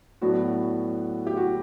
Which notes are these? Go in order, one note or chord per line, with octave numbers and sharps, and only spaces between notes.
A2 F#3 B3 D4 F#4
G4
F#4